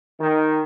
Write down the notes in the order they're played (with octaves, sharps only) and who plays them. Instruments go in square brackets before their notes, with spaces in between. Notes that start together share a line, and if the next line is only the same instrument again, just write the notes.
[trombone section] D#3